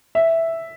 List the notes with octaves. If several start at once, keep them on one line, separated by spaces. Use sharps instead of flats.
E5